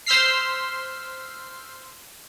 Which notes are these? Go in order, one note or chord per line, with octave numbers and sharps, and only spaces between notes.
C5 C6 E6 F6 B6 C7